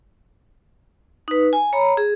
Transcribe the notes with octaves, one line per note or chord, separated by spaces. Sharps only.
D#4 B4
G#5
C#5 A#5 B5
G#4